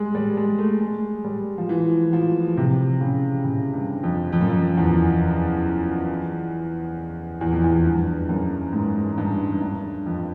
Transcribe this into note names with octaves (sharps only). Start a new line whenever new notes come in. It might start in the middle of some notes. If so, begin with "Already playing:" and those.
Already playing: G3 G#3
G3
G#3
A3
G#3
G3
F3
E3
F3
C3
C#3
C#3
G2
F2
F2
F#2
F2
E2
E2
F2
E2
G2
F#2
G#2
G2
G2
F2